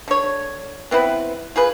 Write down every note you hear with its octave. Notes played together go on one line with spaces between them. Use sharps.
D3 C#5
B3 C4 E4 B4
F4 G#4 B4